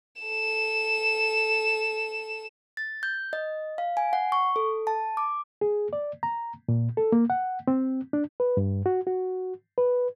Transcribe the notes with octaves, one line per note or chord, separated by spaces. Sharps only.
A4 E7
A6
G6
D#5
F5
G#5
F#5
C#6
A4
A5
D6
G#4
D5
A#5
A#2
A4
A#3
F#5
C4
D4
B4
G2
F#4
F#4
B4